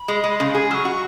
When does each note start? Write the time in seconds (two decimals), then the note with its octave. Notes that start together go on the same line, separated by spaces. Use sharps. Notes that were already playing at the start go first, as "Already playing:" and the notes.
Already playing: B5
0.08 G#3
0.24 G#3
0.40 C#3 B5 C#6
0.55 G#4
0.71 F#3 C#6 F6
0.85 F#4